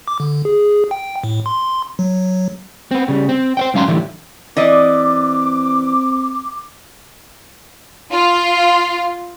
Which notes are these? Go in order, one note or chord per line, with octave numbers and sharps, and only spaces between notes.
D6
D3
G#4
G5
A2
C6
F#3
B3 C4
C#3 G3
C4
C5 C#5 G5
G#2 F#3 C#4 F5 A#5 C6
A2 D3 E3 G3
E3 C4 D5 D#5 D6
F4